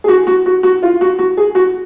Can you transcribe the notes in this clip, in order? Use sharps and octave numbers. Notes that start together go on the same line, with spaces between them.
G#4
F#4
F#4
F#4
F#4
F4
F#4
F#4
G#4
F#4